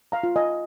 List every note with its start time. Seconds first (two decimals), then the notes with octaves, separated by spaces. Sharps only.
0.12 F5 A#5
0.23 F4
0.36 D#5 G#5